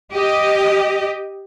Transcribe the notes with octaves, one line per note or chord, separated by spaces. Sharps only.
G4 D#5